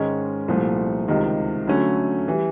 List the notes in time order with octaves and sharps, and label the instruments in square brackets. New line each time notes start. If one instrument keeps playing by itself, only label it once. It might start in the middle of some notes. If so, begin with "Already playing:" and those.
Already playing: [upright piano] G#2 D#3 G#3 C#4
C2 A#2 F3 A3
C#2 C3 D#3 G3
D3 F#3 A3 C#4
E3 G3